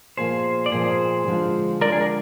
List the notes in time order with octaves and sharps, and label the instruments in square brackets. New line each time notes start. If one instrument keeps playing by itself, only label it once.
[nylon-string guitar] A#2 F3 A#3 [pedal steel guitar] G#4 C5
[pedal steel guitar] D5
[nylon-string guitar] A#2 F3 A#3 [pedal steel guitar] G#4 C5
[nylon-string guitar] D3 F3 G#3 D4 F4
[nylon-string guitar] D3 F3 G#3 D4 F4 [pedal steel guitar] A#4 D5
[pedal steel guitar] G#4
A#4